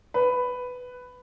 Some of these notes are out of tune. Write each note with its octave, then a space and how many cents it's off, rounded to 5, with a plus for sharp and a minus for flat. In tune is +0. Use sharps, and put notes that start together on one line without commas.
B4 +10